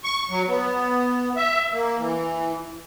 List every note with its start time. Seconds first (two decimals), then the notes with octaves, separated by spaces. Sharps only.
0.04 C#6
0.30 F#3
0.48 B3
1.37 E5
1.72 A#3
1.98 E3